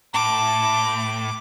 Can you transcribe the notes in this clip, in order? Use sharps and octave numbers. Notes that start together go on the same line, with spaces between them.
A2 A5 D6